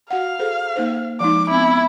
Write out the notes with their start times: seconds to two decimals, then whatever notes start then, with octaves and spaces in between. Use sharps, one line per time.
0.11 F#4 F5 F#5
0.39 G#4 A4 C5
0.76 A#3 D#4 C5
1.20 F3 G#3 D#4 D6
1.50 B3 C4 E4